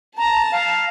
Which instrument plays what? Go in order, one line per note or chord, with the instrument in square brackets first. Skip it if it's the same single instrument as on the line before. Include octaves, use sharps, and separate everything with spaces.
[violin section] A5 [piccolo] A#5
[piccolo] F5